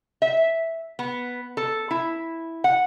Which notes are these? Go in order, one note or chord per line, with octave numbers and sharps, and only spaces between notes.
E5
B3
A4
E4
F#5